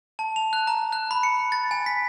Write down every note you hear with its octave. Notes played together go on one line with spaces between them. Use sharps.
A5
F7
F#6
A#5
F#6
B5
C#7
A6
G#5
B6